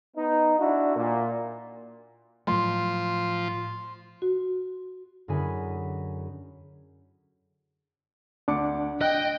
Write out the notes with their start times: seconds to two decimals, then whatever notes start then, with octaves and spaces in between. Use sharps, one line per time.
0.17 B3 D#4
0.59 D4 E4 F#4
0.96 A#2
2.47 A2 F3 F#3 A3 C6
4.22 F#4
5.28 F#2 D3 E4 G#4 G#5 B5
8.48 D2 D4 D6 C#7
9.01 D#5 G5 F#6